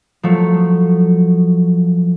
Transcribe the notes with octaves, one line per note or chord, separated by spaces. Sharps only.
F3 F#3 A3